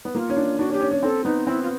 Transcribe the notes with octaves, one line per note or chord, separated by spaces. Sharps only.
B3
A#3 F4
C#4
D4
D4 F#4
C#4
G4
C#4
C#4
C4 A4
B3 D#4
C4 E4
F4